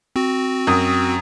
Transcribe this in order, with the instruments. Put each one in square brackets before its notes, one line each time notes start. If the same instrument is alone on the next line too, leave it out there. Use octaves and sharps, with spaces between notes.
[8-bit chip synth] C4 F#4
[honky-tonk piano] F#2 D#6